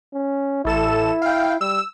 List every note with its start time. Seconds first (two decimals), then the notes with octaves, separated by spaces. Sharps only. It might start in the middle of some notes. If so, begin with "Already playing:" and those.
0.13 C#4
0.65 A1 E4 A4 E7
1.22 F5 G5
1.61 G3 E6